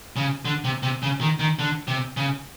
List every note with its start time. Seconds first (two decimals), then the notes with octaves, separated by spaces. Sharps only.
0.16 C#3
0.45 D3
0.64 C3
0.83 C3
1.02 C#3
1.21 D#3
1.40 D#3
1.59 D3
1.88 C3
2.17 C#3